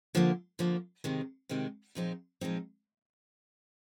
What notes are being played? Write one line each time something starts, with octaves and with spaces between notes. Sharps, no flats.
D3 F3 A#3
D3 F3 A#3
C3 D#3 G#3 C4
C3 D#3 G#3 C4
A#2 F3 G#3 C4 D#4
A#2 F3 G#3 C4 D#4